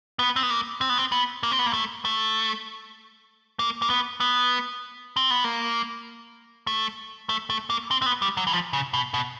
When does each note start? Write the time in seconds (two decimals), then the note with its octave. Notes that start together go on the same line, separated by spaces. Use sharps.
0.19 B3
0.36 C4
0.43 B3
0.50 A#3
0.81 C4
0.89 B3
0.98 C4
1.12 B3
1.43 A#3
1.51 C4
1.59 B3
1.66 A#3
1.73 A3
2.05 A3
3.59 A#3
3.82 A#3
3.90 B3
4.20 B3
5.16 C4
5.31 B3
5.44 A#3
6.67 A3
7.29 A3
7.50 A3
7.70 A#3
7.91 C4
8.02 C4
8.06 B3
8.22 G3
8.37 F#3
8.47 E3
8.52 F3
8.73 C#3
8.94 B2
9.14 B2